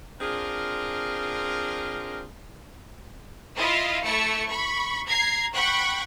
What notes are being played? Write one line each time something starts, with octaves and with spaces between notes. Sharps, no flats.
C4 D4 F4 G#4 A#4
E4 F4 D#5 F5
A3 E4 A4 C#6 C#7
B5 C#6
A#5 G#6 C7
F#5 G5 B5 C#6 F#6